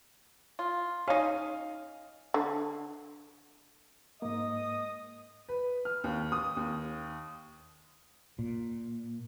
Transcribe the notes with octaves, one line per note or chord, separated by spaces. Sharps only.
F4
C#4 D#4 F5
D3
G#2 A#3 D#5 D#6
B4
F6
D#2
D#6
D#2
A#2